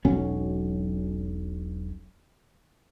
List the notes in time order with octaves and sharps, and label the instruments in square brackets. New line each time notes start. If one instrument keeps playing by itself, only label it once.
[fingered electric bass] E1 B1 F#3 C#4